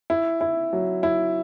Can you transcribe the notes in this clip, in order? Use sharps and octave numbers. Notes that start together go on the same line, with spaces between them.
E4
E4
F#3
E4